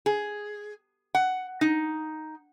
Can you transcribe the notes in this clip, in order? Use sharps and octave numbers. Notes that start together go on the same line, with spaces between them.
G#4
F#5
D#4